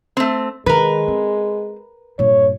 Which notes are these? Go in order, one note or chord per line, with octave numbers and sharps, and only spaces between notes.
A3 C4
D#3 G#3 A#4 B4
C4
G2 A#2 C#5